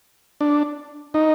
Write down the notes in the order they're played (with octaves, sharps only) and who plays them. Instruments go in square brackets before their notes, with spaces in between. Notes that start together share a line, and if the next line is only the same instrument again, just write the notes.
[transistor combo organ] D4
D#4